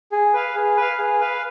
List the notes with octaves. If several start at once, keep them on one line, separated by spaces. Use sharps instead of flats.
G#4
B4 F5
G#4
B4 F5
G#4
B4 F5